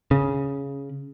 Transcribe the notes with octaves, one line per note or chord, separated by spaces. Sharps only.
C#3